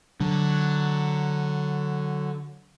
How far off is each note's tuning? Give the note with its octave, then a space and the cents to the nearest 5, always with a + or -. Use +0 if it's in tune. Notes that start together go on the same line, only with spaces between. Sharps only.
D3 +0 F#3 +0